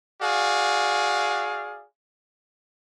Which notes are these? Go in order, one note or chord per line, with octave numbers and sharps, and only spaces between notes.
F#4 G#4 D5 F5